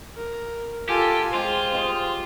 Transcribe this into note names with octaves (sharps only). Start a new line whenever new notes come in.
A#4
F4 G4 A4 G#5
G#3 F4 G4 C5
G4 D#5 A5